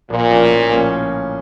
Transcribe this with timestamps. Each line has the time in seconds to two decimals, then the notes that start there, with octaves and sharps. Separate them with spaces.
0.10 A#1 A#2
0.31 A2 F3 A#3 C#4
0.51 A#1
0.72 A2 F3 A#3 C#4